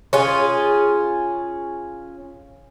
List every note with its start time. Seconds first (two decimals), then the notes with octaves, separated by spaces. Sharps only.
0.13 C#4 F4 G#4